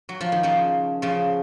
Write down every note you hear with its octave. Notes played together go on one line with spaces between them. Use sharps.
F#3
F3
D#3
C#3 F3
C#3 F3